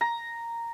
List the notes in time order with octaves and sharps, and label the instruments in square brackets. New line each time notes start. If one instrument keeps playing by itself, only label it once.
[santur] A#5